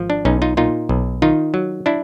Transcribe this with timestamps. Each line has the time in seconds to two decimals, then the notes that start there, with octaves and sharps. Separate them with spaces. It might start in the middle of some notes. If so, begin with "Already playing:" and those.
Already playing: G#1 F3
0.10 D4
0.25 B1 C#4 D#4
0.42 D#4 F4
0.57 A#2 D#4 F4
0.89 B1
1.22 D#3 D#4 F4
1.54 F#3
1.86 D4 E4